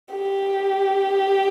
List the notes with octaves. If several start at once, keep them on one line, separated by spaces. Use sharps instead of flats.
G4